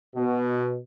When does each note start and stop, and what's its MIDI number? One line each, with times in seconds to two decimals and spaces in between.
0.16 0.77 47